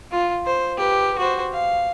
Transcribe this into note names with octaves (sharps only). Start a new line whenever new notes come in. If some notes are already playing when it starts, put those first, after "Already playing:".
F4
C5
G4 B4
F#4 C5
F5